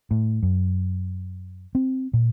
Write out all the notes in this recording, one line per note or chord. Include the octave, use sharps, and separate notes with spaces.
A2
F#2
C4
A#2